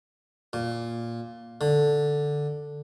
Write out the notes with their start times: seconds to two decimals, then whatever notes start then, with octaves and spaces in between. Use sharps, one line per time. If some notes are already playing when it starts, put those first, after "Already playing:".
0.53 A#2
1.61 D3